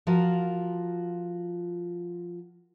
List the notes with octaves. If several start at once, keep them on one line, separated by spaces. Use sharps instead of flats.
F3 F4 F#4 A#4